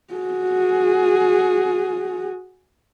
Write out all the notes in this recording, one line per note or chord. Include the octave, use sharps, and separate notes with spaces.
F#4 G#4